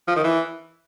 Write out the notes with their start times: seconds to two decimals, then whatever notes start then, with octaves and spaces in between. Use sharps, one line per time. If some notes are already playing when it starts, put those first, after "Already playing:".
0.08 F3
0.16 D#3
0.24 E3